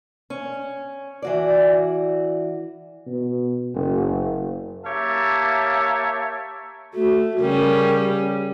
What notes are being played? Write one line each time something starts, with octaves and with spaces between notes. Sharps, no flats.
C#4
E3 F#4 D5
B2
F#1
A#3 G4 C#5 E5 A5
A3 F#4
C#3 G3 C#4 A#4
G4